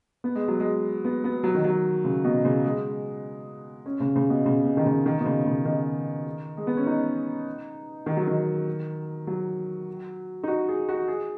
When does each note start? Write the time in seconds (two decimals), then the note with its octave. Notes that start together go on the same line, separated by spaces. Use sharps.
0.24 B3
0.35 G#3
0.48 F#3
0.60 G#3
1.05 B3
1.24 B3
1.43 F#3
1.55 D#3
1.64 F#3
2.04 C#3
2.24 B2
2.44 C#3
2.65 G#3
3.86 C#4
4.00 C#3
4.16 C#3
4.30 B2
4.46 C#3
4.65 B2
4.77 D#3
4.86 C#3
5.06 D#3
5.20 B2
5.25 C#3
5.46 C#3
5.65 D#3
6.57 G#3
6.67 B3
6.77 C#4
6.87 D#4
8.06 D#3
8.17 F#3
8.27 D#3
9.27 F#3
10.43 D#4
10.48 F#4
10.68 G#4
10.89 F#4
11.08 G#4